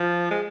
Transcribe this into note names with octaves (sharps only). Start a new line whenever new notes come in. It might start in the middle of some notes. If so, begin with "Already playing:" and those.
Already playing: F3
G#3